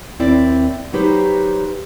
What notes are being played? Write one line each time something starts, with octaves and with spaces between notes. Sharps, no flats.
D#2 C4 E4 D5
F#3 D#4 G4 B4 C5